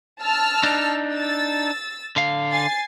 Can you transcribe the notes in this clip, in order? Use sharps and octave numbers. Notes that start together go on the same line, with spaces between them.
A5 E6 F6
D4 D#4
E6 A6
D3 F5
G#5 A6 C7